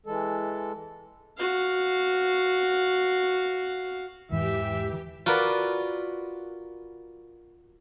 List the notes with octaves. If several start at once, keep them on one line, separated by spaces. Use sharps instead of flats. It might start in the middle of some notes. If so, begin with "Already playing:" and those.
E3 G#3 A4
F#4 F5
E2 G#2 E3 G4 E5
F4 F#4 A#4 B4 D5